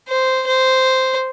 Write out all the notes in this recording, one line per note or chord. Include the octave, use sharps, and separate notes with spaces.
C5
C5